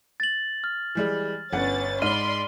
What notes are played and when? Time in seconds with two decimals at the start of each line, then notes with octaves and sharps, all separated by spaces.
0.20 A6 F#7
0.64 F6
0.95 E3 G3 G#3
1.53 G1 C#4 B4 F#5 A6
2.02 G#2 D#4 D5 B5 C6 F6 D#7 G7